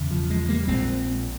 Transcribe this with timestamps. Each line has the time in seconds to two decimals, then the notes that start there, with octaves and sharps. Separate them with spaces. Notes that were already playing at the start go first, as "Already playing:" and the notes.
Already playing: E1 E2 C#3
0.11 F3
0.30 F3 G#3
0.49 G3 A#3
0.68 A#1 A#2 G#3 C4